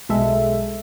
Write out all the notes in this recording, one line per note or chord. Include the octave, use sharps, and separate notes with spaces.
B1 G#3 A4 E5